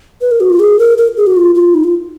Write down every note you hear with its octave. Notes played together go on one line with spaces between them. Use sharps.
B4
A#4
F#4
F4
G#4
A#4
A#4
G#4
F#4
F4
F4
D#4
F4